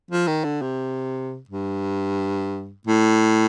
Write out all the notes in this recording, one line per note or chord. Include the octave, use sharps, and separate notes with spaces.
F3
D#3
D3
C3
G2
A2